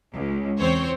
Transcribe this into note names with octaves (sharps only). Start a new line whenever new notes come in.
C#2
E2 C4 C5 C#5